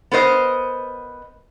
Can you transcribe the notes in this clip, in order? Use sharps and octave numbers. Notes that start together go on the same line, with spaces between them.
B3 A#4 C5 D#5